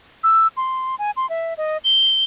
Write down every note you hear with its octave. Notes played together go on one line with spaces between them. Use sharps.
E6
C6
G#5
C6
E5
D#5
G7